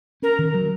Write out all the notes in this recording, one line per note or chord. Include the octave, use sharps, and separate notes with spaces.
C#4 A#4
D#3
F#3